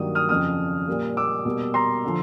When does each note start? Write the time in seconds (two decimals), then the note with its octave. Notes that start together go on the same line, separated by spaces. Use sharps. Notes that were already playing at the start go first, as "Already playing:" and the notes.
Already playing: G2 D#3 F#3 A#3 D#6
0.15 D#6 F6
0.29 F2 C#3 F3 D#6 F6
0.87 A#2 G3 A#3
1.17 D6 E6
1.45 B2 G3 A#3
1.74 A#5 C6
2.05 D3 F3